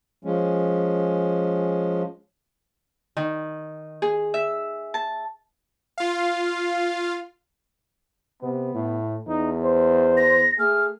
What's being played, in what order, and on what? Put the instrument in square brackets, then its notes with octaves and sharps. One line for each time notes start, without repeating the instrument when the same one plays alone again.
[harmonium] F3 G#3 C#4
[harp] D#3
G#4
E5
A5
[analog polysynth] F4 F5
[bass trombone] C3 [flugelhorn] B3
[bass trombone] A2
[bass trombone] E2 [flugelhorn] D#4
[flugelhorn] C5
[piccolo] A#6
[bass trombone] A3 [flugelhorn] G#4 [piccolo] F6